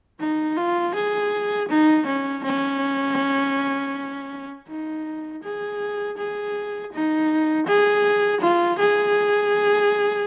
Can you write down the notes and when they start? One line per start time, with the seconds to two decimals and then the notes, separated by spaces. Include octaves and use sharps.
0.20 D#4
0.56 F4
0.95 G#4
1.69 D#4
2.07 C#4
2.44 C#4
4.68 D#4
5.43 G#4
6.17 G#4
6.92 D#4
7.67 G#4
8.41 F4
8.79 G#4